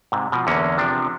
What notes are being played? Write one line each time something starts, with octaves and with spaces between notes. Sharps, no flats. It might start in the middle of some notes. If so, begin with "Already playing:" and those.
G#2 C3
B2 F3
E2 D3 A#3 C#4
C3 F3 D4